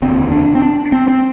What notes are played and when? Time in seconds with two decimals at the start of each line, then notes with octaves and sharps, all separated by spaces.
0.02 F1 D#2 D3 C4
0.32 D4
0.55 C4
0.62 D4
0.92 C4
1.08 C4